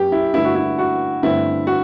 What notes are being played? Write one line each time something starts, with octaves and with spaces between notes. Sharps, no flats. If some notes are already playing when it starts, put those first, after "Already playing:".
Already playing: F#2 G4
E4
G2 D3 A3 E4
F#4
E4
F#4
G2 D3 A3 C4 E4
F#4